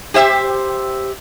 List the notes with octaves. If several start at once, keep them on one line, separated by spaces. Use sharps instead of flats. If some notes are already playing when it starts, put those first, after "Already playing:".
G4 C5 E5